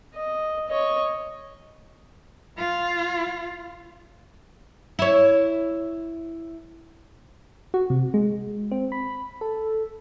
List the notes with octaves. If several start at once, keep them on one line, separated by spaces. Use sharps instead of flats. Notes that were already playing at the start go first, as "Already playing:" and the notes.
D#5
C#5 D#5
F4
E4 C#5
F#4
C3
G#3
C4
B5
A4